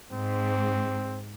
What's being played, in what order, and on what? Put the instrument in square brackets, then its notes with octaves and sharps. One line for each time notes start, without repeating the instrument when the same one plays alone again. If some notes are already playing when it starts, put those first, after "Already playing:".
[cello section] G#2 [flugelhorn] C4